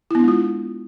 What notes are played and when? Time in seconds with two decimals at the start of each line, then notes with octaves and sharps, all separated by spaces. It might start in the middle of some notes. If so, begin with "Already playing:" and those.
0.11 E4
0.15 B3
0.19 D4
0.24 G#3
0.28 F4